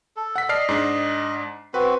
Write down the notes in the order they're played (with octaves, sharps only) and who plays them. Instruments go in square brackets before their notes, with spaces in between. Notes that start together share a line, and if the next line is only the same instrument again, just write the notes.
[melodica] A4
[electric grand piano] F#5 B6
[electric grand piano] D5 F6 C7 [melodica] D#5
[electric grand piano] G#2 D4
[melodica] C4 F#4 [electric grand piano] B4